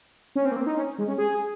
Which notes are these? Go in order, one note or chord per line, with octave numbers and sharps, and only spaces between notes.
C#4
C4
A#3
C4
D#4
C#4
G#3
C#4
G#4